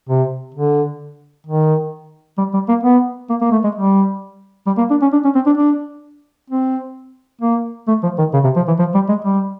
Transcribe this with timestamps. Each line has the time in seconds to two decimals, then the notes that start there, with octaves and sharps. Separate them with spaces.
0.09 C3
0.55 D3
1.47 D#3
2.38 G3
2.54 G3
2.69 A#3
2.84 B3
3.30 A#3
3.41 A#3
3.52 A3
3.64 G#3
3.75 G3
4.67 G3
4.78 A#3
4.90 D4
5.02 C#4
5.13 D4
5.24 C#4
5.35 C4
5.47 D4
5.58 D4
6.50 C4
7.41 A#3
7.88 A3
8.03 F3
8.18 D#3
8.34 C#3
8.44 C3
8.56 F3
8.68 E3
8.79 F3
8.94 G3
9.09 G#3
9.25 G3